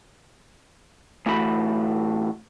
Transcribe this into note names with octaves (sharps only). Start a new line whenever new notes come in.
D2 A2 E3 A3 F#4 B5